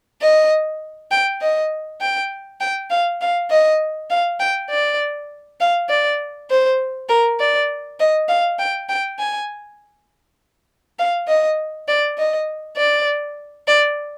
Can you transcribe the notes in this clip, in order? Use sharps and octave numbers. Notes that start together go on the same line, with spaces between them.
D#5
G5
D#5
G5
G5
F5
F5
D#5
F5
G5
D5
F5
D5
C5
A#4
D5
D#5
F5
G5
G5
G#5
F5
D#5
D5
D#5
D5
D5